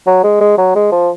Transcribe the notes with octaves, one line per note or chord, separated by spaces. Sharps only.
F#3
G#3
G#3
F#3
G#3
F3